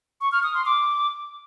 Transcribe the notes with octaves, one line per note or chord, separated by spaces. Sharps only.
C#6
F6
D#6
C6
D6